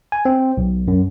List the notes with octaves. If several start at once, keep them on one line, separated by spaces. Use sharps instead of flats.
G#5
C4
B1
F#2